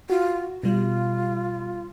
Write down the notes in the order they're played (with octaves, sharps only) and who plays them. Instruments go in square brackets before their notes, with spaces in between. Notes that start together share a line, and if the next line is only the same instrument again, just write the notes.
[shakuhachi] F4 [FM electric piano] F#4
[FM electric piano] B2 G3 [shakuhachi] F4